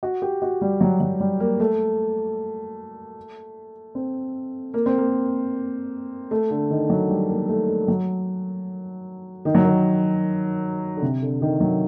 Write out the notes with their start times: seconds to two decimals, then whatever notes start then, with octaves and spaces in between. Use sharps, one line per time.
0.03 F#4
0.22 G4
0.42 F#4
0.61 G3
0.81 F#3
1.00 F#3
1.20 G3
1.40 A#3
1.60 A3
3.95 C4
4.74 A#3
4.86 C4
4.98 A#3
6.31 A3
6.50 D3
6.70 D#3
6.90 F#3
7.09 G3
7.29 A#3
7.49 A3
7.68 A3
7.88 F#3
9.45 D#3
9.55 F#3
9.65 D#3
10.97 D3
11.02 C3
11.22 D3
11.41 D#3
11.60 F#3